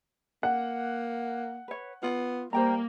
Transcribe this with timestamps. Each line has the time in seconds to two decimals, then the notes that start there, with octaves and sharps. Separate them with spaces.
0.43 A#3 F#5
1.68 B4 C#5
2.03 B3 F4
2.53 G3 A#3 C5 G5 A#5